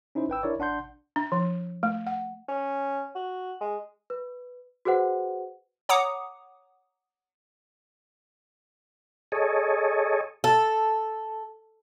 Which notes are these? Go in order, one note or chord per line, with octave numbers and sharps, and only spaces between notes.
C#4 D#4 E4 C5
G#1 B4 G5 E6
D4 E4 A#4 C#5 D5
A1 D4 F#5 C6 G6
D4
F3
A3
F#5
C#4
F#4
G#3
B4
F#4 G#4 B4 C5 F#5
C#5 F#5 A#5 D6 D#6 C#7
G#4 A4 C#5 D#5
A4